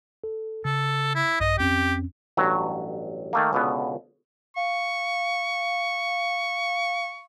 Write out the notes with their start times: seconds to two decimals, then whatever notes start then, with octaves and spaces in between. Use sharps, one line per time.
0.24 A4
0.65 C#3 A4
1.15 E4
1.40 A#1 G2 D#5
1.58 F2 C4 C#4 G4
2.37 A1 G2 F#3
3.33 D#3 A3 A#3
3.53 C#2 B2 D3 B3
4.56 F5 C#6